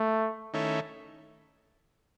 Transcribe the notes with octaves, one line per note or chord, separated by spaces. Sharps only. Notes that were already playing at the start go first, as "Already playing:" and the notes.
Already playing: A3
D#3 A3 C#4 E4